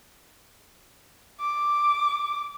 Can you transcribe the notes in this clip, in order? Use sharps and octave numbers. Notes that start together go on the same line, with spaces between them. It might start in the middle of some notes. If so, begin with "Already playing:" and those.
D6